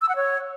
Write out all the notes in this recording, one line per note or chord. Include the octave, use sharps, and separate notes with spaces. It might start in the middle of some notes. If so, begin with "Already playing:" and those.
E6
F#5
C#5